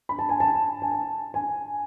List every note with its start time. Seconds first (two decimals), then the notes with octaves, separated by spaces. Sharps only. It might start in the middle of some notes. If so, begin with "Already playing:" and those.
0.09 B5
0.19 A5
0.29 G#5
0.40 A5
0.82 G#5
0.92 A5
1.34 G#5